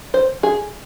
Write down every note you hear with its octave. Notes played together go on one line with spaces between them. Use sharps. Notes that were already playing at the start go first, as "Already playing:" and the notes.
C5
G#4